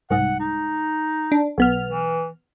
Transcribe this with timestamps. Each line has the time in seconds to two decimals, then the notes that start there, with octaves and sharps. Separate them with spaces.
0.10 C2 G#2 F#5
0.40 D#4
1.32 D4
1.58 B1 B3 F6
1.88 E3